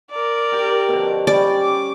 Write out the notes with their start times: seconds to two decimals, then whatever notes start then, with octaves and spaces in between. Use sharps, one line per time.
0.11 A#4 D5
0.52 G4 G5
0.88 B2 D3 F3
1.27 G3 C#4 G4 D5
1.61 D6